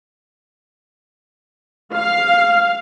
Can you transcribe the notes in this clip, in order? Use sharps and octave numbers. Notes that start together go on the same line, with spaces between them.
F5